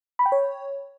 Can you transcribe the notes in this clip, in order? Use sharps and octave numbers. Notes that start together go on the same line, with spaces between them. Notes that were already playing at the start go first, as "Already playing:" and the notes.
B5
G5
C#5